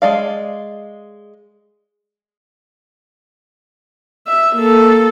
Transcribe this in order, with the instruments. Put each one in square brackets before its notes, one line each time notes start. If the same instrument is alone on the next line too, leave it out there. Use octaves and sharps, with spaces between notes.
[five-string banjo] G#3 D5 F5
[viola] E5
A#3 A4